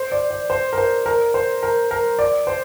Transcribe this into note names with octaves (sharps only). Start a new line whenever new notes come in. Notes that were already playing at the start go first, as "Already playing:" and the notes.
Already playing: C5
D5
D5
C5
A#4
C5
A#4
C5
A#4
A#4
D5
C5